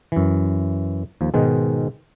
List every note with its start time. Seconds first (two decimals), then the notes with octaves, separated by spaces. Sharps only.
0.12 F#2 E3
1.21 D#2 F3
1.34 G#2 B2 D#3 G#3